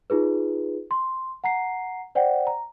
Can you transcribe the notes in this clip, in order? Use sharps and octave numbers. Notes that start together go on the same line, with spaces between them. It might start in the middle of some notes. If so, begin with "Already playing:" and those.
D#4 F4 G#4 B4
C6
F#5 A#5 C7
C5 D5 F#5 G5
A#5